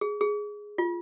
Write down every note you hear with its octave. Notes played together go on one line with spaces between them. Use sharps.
G#4
G#4
F4